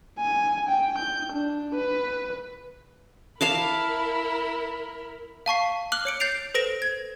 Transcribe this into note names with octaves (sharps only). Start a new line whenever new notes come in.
G#5
G5
G6
D4
B4
E4 A#4 F5 A5 B5 D6
F5 A5 C#6 C7
D6 F6 F#6 F#7 G7
C#5 C#7 D7
G6 A6 C7 D7 F7
A4 B4 C5 A#6 D7 E7
G#6